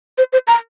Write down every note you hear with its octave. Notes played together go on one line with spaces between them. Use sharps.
C5
C5
A#5